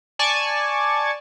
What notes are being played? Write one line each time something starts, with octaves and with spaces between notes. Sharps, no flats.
D5 G#5 A5 C#6